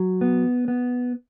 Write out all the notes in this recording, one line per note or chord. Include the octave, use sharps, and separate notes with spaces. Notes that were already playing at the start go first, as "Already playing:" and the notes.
Already playing: F#3
B3
B3